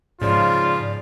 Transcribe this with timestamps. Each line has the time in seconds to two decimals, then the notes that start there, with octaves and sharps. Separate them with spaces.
0.21 G#2 C#3 F3 D#4 F4 D5